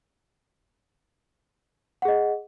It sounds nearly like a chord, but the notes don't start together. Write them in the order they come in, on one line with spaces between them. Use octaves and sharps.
F#5 G#4 D#5